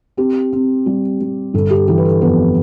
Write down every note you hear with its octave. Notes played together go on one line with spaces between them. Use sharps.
C4 G4
C4
G3
G3
G1 A4
G4
E3 G4
B4
A4
F2 B3 B4